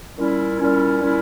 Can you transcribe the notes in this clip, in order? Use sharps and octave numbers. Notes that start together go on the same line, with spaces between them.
A#2 G3 C#4 E4
A#2 G3 C#4 E4
A#2 G3 C#4 E4